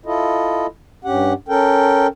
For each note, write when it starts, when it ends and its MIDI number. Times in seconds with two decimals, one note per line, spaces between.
0.06 0.66 64
0.06 0.66 65
0.06 0.66 69
0.06 0.66 75
1.05 1.33 43
1.05 1.33 61
1.05 1.33 67
1.05 1.33 78
1.49 2.07 61
1.49 2.07 69
1.49 2.07 70
1.49 2.07 79